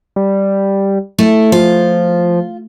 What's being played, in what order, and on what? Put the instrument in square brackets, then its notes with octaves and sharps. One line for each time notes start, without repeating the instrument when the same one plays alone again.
[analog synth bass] G3
[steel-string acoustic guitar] A3 E4 A4
[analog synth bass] F3 [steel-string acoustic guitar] F4